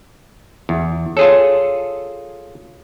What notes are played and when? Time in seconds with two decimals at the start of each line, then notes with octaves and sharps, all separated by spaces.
0.69 E2
1.17 F4 G#4 A4 C#5